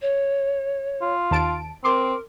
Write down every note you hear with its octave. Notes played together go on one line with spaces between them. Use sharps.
C#5
F4
D#2 A5 D7
C4 A#4 C6 D6